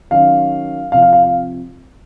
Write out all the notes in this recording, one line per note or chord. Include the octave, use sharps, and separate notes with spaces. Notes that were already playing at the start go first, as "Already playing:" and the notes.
D#3 F#3 C#4 F5
C3 F3 C4 F5
F5
F5
F5